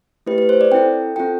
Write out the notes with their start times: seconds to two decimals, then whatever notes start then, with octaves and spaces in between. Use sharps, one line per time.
0.26 A3 E4 G4 B4
0.38 B4
0.49 C5
0.61 D5
0.72 C4 E4 A4 G5
1.16 C4 F4 A4 G5